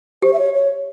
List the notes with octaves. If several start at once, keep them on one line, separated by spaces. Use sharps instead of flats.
G4 C5
E5
C#5
C#5